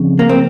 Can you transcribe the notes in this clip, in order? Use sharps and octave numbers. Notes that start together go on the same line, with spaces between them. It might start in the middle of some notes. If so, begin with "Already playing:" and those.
Already playing: F2 C#3
A#3
C4